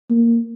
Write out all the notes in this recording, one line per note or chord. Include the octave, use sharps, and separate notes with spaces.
A#3